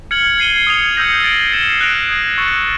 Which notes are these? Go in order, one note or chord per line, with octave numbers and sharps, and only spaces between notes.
F6 G#6 C#7 F#7
G#6 C7 D#7 G7
D#6 G#6 C#7 F7
E6 G6 A#6 C#7 F#7
A6 D7 F#7
A6 C7 E7 G7
F#6 A#6 D7 F7
D#6 G#6 C7
C#6 E6 A6 C#7